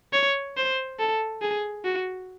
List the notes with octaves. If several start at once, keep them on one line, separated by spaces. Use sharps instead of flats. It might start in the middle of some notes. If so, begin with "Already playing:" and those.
C#5
C5
A4
G#4
F#4